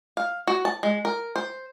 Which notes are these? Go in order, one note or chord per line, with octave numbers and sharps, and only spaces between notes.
F5
F#4
A5
G#3
A#4
C5